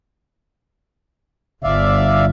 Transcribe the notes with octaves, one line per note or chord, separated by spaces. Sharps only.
G1 D5 E5 F5